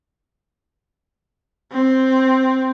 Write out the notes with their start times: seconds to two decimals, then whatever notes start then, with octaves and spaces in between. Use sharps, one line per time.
1.72 C4